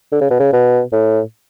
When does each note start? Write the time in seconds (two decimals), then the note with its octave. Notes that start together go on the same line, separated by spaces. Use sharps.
0.12 D3
0.21 C#3
0.30 B2
0.39 C#3
0.53 B2
0.92 A2